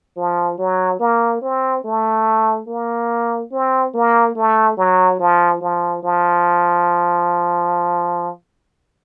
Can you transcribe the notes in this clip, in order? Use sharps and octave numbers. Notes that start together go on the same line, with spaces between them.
F3
F#3
A#3
C4
A3
A#3
C4
A#3
A3
F#3
F3
F3
F3